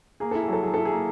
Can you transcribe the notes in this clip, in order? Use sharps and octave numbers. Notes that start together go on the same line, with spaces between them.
A#3 G#4
E4 A4
G#4
F#3 A4
F#3 G#4
E4 A4
G#4
A#3